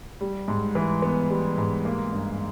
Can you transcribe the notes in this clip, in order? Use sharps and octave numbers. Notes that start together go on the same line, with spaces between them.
G3
G#2
E3
B3
G3
G#2
A#3
G2